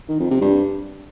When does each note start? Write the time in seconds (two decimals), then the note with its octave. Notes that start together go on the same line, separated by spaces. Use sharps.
0.09 D#3
0.20 F2
0.31 C3
0.42 G2